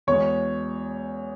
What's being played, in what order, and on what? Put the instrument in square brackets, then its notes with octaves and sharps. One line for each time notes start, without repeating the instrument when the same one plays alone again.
[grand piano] E2 B2 G#3 C#5